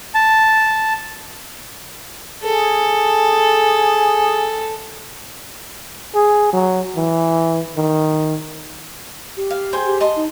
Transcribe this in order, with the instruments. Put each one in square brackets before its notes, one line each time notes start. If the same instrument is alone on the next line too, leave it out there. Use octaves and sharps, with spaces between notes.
[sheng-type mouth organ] A5
[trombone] G#4 [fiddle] A4
[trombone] G#4
F#3
E3
D#3
[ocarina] G4
[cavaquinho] F5
G#4 C5 G5
[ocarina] G4
[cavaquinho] D#5 A5 C6
[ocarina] D#4